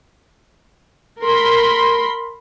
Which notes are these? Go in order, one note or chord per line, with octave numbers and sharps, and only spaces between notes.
A#4 B5 C6